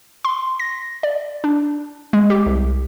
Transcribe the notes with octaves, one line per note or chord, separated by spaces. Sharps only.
C6
A#6
D5
D4
G#3
G4
C2